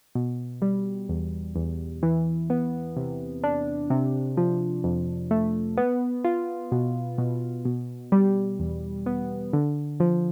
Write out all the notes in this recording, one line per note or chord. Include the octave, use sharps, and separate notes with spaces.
B2
G3
E2
E2
E3
B3
C3
D4
C3
F3
F2
A3
B3
F4
B2
B2
B2
G3
E2
B3
D3
F3